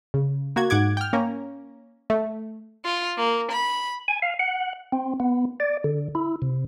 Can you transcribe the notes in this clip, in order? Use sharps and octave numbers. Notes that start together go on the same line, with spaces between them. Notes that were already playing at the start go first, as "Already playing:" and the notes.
C#3
A#3 F#4 G#6
G#2 F#5 D6 G#6
G5 F6
A#3 C#4 A#4
A3
F4
A#3
B5
G#5
F5
F#5
C4
B3
D5
D3
E4
C3